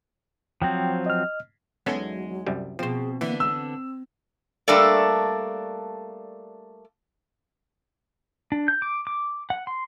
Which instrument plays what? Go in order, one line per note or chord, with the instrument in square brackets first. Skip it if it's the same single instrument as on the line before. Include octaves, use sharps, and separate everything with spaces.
[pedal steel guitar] F3 F#3 C4 [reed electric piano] G5
[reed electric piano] D#5 F6
[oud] E2 G#3 D#4 [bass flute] F#3 [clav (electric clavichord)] B3 C#4 A4
[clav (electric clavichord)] C2 F#2 G3
[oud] B2 C4 [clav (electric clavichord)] F3 C5 [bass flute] G#4
[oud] D3 B3 [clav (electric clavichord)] E3 [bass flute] A#3
[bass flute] G#3 [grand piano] E6
[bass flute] C4
[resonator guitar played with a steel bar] G3 A3 A#3 D4 A4 D5
[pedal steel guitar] D4
G6
D6
D6
F#5
C6